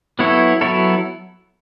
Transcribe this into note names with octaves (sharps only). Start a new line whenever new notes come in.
F#3 B3 E4 A4 C#5
F#3 B3 E4 A4 C#5